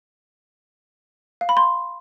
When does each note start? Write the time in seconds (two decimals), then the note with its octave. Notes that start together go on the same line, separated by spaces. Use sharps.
1.41 F5
1.49 B5
1.57 C6